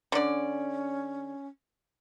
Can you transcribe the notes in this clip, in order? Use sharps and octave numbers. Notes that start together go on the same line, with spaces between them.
D3 C#4 D5